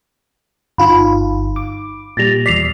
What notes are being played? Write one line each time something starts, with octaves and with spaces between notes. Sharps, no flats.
G1 D#4 F4 B5
D6
A#2 G3 A6 A#6 F7
E2 D5 B6 C7 F7